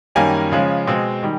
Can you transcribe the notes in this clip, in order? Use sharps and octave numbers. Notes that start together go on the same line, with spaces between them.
F#2 D#3 G3 A#3 C#4 G#5
C#3 F3 G#3 C#4
B2 G#3 C4
D#3 G3